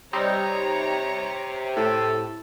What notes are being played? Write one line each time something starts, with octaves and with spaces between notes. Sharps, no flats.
C3 G3 C4 D#4 C#5 A#5
A2 A4